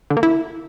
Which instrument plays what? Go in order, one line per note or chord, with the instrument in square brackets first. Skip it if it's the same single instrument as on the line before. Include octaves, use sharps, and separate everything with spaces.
[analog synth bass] D3
A#3
E4